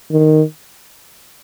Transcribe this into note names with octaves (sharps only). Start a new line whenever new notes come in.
D#3